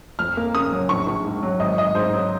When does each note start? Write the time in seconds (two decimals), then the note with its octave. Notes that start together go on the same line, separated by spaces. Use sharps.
0.19 F2 F6
0.37 A#3
0.55 C#3 D#6
0.72 F#3
0.89 A#1 C#6
1.07 A#1
1.25 G#2
1.43 F#3
1.60 G#1 D#5
1.78 G#1 D#5
1.95 G#2 C5
2.13 F#3